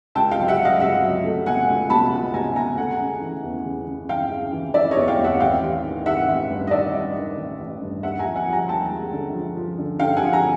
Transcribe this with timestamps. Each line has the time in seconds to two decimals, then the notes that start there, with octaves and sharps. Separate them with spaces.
0.15 C#2 G5 A5
0.31 F5 G5
0.38 F#3
0.48 E5 F#5
0.59 F#3
0.65 D#5 F5
0.80 C#2 E5 F#5
1.03 F#3
1.24 A3
1.46 B2 F#5 G#5
1.68 C#2
1.90 B2 A5 B5
2.12 C#2
2.34 B2 G#5 A#5
2.55 B2 G#5 A#5
2.78 A3 F#5 G#5
2.99 C#3
3.21 E3
3.43 E2
3.66 C#3
3.87 C#3
4.09 E3 F5 G5
4.31 C#3
4.53 E3
4.74 E3 D5 E5
4.91 C#5 D#5
4.97 E2
5.08 F5 G5
5.18 E2
5.24 E5 F#5
5.40 A1 F5 G5
5.63 A1
5.84 D#3
6.06 D#3 E5 F#5
6.28 A1
6.50 G2
6.67 D#5
6.71 D#3 D5 E5
6.94 G2
7.15 D#3
7.38 A1
7.59 A1
7.81 G2
8.03 D#2 E5 F#5
8.19 G#5 A#5
8.25 F3
8.36 F#5 G#5
8.47 F3
8.52 G#5 A#5
8.68 D#2 G5 A5
8.90 G#3
9.13 D3
9.35 F3
9.56 F3
9.78 D3
9.99 D3 F5 G5
10.16 F#5 G#5
10.22 F3
10.33 G#5 A#5